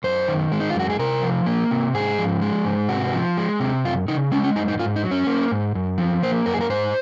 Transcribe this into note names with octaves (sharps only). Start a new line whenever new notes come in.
F#2 C5
D#3
G#3
D#4
F4
F#2 F#4
G#4
C3 A#4
F3
A#3
C3
G#2 G#4
F3
G#3
G#2
C3 F#4
F3
G#3
C3
F#2 F4
C#3 D#4
G#3 C#4
C#4
F#2 D#4
D#4
G#2 F4
D#4
F#3
C#4
A#3
G#2
F#2
F3
A#3 C5
F#2 A#4
G#4
A#4
G#2 C5